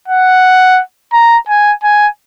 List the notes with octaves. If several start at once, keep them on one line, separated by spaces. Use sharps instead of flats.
F#5
A#5
G#5
G#5